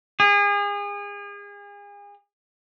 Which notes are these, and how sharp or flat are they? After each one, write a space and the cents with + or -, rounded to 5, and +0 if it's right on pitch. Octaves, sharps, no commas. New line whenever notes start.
G#4 -35